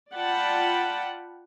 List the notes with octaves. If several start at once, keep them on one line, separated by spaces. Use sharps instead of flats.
F4 D5 F#5 G5 A5 B5